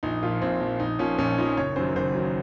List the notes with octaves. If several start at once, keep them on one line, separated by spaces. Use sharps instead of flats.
A#1 D#4
A#2 F3 F4
A#1 C4
A#2 F3
A#1 D#4
A#2 F3 C#4
A#1 C#4
A#2 F3 D#4
F#1 C#5
F#2 D#3 F#3 C5
F#1 C5
D#3 F#3